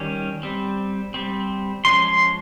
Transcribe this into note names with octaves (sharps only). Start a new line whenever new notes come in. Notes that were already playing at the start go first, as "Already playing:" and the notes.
Already playing: D#3 G3 C#4
G3 C4
G3 C4
F3 G#3 C#4 C6
C6